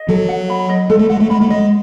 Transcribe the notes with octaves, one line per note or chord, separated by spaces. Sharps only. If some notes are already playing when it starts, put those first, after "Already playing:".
Already playing: D#5
F#3 A4
F#5
B5
D#5
G#3 A4
A3
G#3 F#5
A3
G#3 B5
A3
G#3 D#5